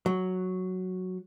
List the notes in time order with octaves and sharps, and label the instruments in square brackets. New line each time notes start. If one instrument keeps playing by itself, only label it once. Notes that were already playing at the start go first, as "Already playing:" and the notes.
[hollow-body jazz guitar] F#3